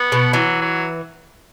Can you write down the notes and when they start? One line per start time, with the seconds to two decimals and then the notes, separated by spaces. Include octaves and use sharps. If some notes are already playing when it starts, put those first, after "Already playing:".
Already playing: B3
0.12 B2
0.33 E3 F#3
0.61 F#3